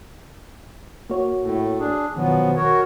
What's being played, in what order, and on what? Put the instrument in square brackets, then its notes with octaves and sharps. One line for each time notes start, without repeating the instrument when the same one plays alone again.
[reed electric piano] A#3 F#4 C#5
[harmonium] A2
D4 G#4
[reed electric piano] F#2 B2 D#3 [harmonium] F3 F#3 B3
[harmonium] F#4 A#4 C#5